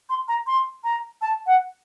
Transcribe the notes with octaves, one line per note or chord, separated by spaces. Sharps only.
C6
A#5
C6
A#5
A5
F#5